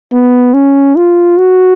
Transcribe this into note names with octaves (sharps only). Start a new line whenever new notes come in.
B3
C#4
F4
F#4